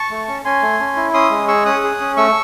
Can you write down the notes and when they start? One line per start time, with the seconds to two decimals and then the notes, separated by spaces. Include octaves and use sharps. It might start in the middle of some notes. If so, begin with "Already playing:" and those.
Already playing: A5 C#6
0.11 A3
0.28 C#4
0.45 C#4 G#5 C6
0.62 A3
0.80 C#4
0.97 E4
1.14 C#4 C6 D#6
1.31 G#3
1.48 G#4 C#6 E6
1.65 C#4 D#6 F#6
1.83 G#4
2.00 C#4
2.17 A3 C#6 E6